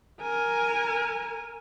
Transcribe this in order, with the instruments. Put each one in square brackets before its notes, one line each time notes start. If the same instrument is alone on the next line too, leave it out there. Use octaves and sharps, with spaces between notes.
[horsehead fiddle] A#4 G#5